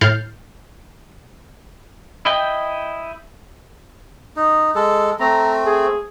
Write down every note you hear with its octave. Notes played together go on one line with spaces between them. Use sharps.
A2 F6 G6 A6 C7
E4 D#5 G5
D#4
G#3 A4
A3 C4 A#5
G#4